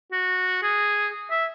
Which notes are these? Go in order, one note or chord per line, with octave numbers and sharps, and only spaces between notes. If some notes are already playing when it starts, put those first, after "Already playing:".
F#4
G#4
E5